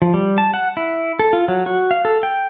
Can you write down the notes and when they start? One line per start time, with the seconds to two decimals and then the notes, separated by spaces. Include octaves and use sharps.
0.02 F3
0.14 G3
0.38 A5
0.54 F#5
0.77 E4
1.19 A4
1.33 F4
1.48 F#3
1.66 F#4
1.91 F5
2.05 A4
2.23 G5